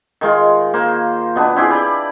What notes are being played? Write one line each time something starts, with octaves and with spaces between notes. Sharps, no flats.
D#3 G#3 F4
A#3 C5
B2 B3 D4
C4 E4 G4 G#4
G4 B4 D5